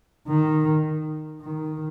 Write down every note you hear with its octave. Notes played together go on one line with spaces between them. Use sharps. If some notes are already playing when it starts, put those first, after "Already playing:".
D#3
D#3